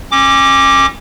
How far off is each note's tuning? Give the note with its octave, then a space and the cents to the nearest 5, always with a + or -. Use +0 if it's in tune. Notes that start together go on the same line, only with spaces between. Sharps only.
C#4 -30 D6 +0